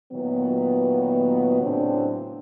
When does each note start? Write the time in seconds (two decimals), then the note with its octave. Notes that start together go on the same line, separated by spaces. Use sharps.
0.12 A#2 D#3 F#3 B3
1.62 A2 C#3 F#3 B3 C4 D4